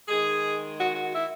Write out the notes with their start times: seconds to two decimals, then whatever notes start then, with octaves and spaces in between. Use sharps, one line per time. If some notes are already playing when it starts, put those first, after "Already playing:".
0.08 D#3 G#3 G#4
0.77 F#4
0.95 F#4
1.12 E4